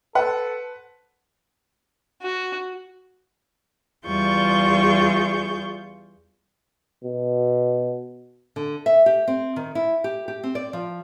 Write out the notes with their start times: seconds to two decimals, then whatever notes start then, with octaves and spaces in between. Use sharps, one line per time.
0.15 A4 B4 C5 F#5
2.22 F#4
4.07 E2 G3 F4 G#4 C#6 G6
7.04 B2
8.56 D3
8.86 E5
9.06 G4
9.28 C4
9.56 D#3
9.75 E4
10.04 G4
10.28 G4
10.43 C4
10.55 D5
10.73 F3